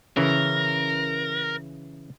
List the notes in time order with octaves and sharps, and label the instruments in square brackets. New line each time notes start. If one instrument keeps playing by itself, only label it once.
[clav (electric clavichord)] C#3 E3 [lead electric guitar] A#4 [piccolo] A#6